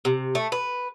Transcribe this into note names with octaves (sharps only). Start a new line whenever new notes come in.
C3
A3
B4